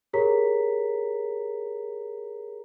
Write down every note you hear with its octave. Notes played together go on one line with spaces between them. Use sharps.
G4 G#4 A#4 C#5 A#5 B6